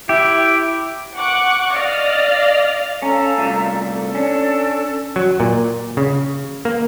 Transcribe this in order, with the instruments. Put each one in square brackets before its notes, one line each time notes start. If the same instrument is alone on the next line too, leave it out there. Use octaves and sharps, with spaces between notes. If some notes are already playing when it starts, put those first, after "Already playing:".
[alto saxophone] E4 [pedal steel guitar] G4
[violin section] F#5 C#6 D6 F#6
D5 D#5 F5 F6 A6 A#6
[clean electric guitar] C#4 [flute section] A4 F5 A#5
[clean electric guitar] C2 A#2 A3
[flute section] A4
[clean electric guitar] C#4 D4
[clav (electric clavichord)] F#3
A#2
C#3
A#3